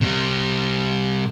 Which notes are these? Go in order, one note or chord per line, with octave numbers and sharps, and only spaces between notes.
C3 G3